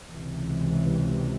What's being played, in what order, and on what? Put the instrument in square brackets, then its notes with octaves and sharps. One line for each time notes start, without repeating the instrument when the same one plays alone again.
[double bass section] C#2 C3 E3